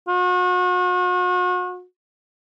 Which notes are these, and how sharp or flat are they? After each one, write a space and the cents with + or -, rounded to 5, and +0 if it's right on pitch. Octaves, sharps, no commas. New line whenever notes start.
F#4 -40